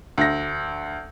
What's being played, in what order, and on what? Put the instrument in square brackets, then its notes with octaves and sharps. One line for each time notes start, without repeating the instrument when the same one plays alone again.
[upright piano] D2 A#6